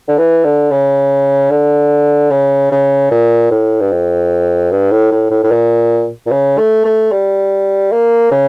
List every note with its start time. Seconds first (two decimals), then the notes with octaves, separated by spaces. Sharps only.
0.08 D3
0.18 E3
0.44 D3
0.71 C#3
1.50 D3
2.31 C#3
2.71 C#3
3.11 A#2
3.51 A2
3.81 G2
3.91 F2
4.71 G2
4.91 A2
5.12 A2
5.31 A2
5.43 A2
5.51 A#2
6.26 A#2
6.31 C#3
6.58 A3
6.85 A3
7.12 G3
7.92 A#3
8.31 C#3